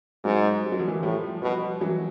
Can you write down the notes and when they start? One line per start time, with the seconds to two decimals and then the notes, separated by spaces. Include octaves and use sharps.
0.24 G#2 F#3 G#3
0.63 G3
0.72 F#3
0.79 F3
0.87 E3 F#3
1.03 A2 F3 G3
1.42 B2 F3 G3
1.81 E3 F#3